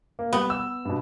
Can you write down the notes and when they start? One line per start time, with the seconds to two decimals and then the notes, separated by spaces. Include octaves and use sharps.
0.19 A#3
0.33 G3 B3
0.50 E6
0.85 G2 B2